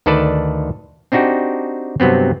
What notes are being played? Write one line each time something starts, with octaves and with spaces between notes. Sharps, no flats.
D2 D#3 A4 B4 D5 A5
C4 D4 D#4 F#4 G4
G2 C3 F#3 B3 C4